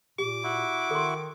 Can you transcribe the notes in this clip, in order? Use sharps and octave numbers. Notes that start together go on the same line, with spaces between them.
A#2 G4 D6
E4 F#4
D#3 A4 C6